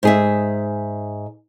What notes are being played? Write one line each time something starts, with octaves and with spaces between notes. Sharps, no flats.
G#2 G#4 E5